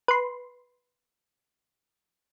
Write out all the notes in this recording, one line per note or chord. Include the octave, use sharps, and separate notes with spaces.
B4 C6